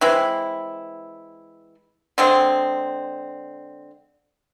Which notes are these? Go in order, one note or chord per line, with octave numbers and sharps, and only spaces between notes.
E3 G#3 C4 E4
D3 G#3 C4